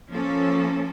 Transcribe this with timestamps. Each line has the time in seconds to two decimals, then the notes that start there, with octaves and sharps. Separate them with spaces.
0.11 F3 A#3 C#4 A4